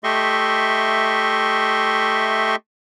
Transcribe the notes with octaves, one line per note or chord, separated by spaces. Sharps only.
A3 G4 D#5 E5 C6 C#6